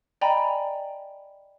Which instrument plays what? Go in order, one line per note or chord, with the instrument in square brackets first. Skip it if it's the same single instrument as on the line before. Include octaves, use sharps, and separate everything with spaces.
[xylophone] D5 D#5 G5 G#5 A#5 B5